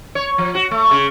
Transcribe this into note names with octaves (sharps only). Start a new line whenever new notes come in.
C#5
F3
F#4
A3
C#3